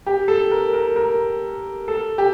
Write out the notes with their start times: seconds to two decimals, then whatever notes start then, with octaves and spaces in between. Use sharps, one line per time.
0.06 G4
0.28 A4
0.51 A#4
0.73 A#4
0.96 A#4
1.88 A4
2.18 G4